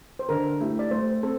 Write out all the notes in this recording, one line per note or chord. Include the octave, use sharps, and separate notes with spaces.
C5
D3 A#4
A3 E4 G4
D5
A3 C5
C4 A4